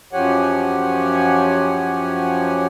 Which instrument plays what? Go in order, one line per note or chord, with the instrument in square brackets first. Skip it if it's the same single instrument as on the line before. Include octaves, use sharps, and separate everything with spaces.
[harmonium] F#2 F3 G4 C#5 F#5 G#5